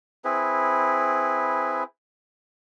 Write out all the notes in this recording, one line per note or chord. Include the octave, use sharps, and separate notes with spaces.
C4 E4 G#4 B4